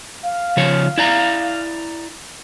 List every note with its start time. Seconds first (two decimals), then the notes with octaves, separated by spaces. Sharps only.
0.23 F5
0.57 C#3 F3 C#5
0.98 E4 D5 A#5